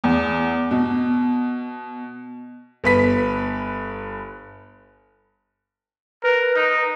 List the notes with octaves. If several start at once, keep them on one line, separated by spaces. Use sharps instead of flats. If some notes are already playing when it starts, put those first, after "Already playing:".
E2
B2
G1 B4 B6
A#4 B4
D#4